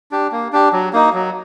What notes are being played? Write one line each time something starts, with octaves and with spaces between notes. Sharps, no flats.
D4 G4
A#3
D4 G4
F#3
A#3 D#4
F#3